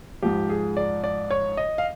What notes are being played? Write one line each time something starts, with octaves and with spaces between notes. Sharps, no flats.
G#2 F3 G4
G#4
D5
D5
C#5
D#5
F5